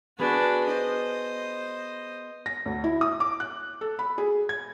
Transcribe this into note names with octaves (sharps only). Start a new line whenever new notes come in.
B3 D4 F#4 G#4 B4
C5 D#5
A#6
D2
E4
D#6
D6
F#6
A4
B5
G#4
G#6